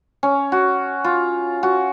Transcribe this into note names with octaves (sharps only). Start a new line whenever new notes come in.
C#4
F#4
F4
F#4